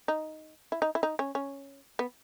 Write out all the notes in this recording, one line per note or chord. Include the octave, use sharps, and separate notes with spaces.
D#4
E4
D#4
E4
D#4
C#4
C#4
B3